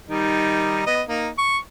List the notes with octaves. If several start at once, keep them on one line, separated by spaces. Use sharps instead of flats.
D#3 G3 D#4
B3 D#5
A#3 D#4
C#6